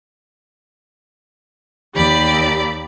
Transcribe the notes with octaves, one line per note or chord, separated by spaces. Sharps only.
D#2 G4 D5 B5